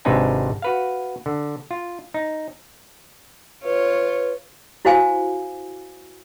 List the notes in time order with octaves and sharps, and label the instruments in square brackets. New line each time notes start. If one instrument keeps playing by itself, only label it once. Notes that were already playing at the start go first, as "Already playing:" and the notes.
[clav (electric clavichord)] G#1 C3 D4 D#4 B4 G#5
F#4 B4 F5
D3
F4
D#4
[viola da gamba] F4 C#5 [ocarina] B4
[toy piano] E4 F#4 C5 F5 G#5